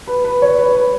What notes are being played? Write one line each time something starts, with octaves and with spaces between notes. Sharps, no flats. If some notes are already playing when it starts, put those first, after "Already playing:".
B4
B4
C#5
B4
B4